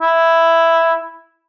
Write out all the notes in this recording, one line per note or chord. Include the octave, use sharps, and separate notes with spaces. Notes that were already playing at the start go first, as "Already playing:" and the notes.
E4